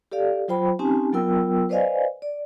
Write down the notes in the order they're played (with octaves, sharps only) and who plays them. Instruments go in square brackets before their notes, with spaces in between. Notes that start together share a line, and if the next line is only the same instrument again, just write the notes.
[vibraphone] G4 A4 D5 F5
F#3 F4 C5 G5 B5
C4 C#4 D#4 G4 G#5 A5
F#3 B3 F4 A#4 G5 E6
B4 C5 D5 D#5 F5 G#5
D5